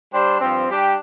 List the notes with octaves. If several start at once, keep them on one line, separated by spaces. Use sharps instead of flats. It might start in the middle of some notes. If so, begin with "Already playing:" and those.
G3 D4 G4 C5
G2 F3 C4
G3 D4 G4